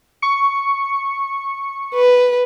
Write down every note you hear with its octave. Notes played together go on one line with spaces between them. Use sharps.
C#6 C#7
B4